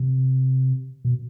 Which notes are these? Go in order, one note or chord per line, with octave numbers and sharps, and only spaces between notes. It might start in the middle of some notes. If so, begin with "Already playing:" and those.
Already playing: C3
B2